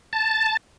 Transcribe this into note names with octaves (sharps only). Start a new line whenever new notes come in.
A5